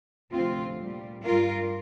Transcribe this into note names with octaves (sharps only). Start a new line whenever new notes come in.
D2 C3 F3 C4 F4
A#2 G3
G2 G3 F4 A#4